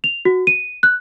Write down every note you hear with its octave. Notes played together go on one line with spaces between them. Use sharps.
F7
F#4
D#7
F#6